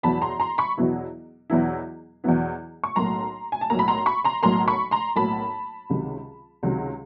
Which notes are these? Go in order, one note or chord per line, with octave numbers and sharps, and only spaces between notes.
E2 B2 F#3 B3 E4 A5 B5
A#5 C6
A#5 C6
B5 C#6
E2 B2 F#3 B3 E4
E2 B2 F#3 B3 E4
E2 B2 F#3 B3 E4
C#6
B1 A2 F#3 A#3 A#5 C6
G#5
A5
B1 A2 F#3 A#3 A#5
B5
A#5 C6
B5 C#6
A#5 C6
B1 A2 F#3 A#3 A#5 C6
B5 C#6
A#5 C6
B1 A2 F#3 A#3 A5 B5
C#2 C3 D#3 F#3
C#2 C3 D#3 F#3